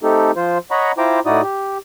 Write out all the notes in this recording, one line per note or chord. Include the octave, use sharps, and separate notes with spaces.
A3 C4 D#4 G4 A4
F3 F4 C5
C#5 D#5 F#5 A#5 B5 C#6
E4 F4 C5 G5 A#5 D6
A2 D#4 E4 F#4 D5 D#6
G4